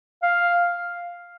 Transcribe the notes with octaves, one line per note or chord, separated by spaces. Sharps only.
F5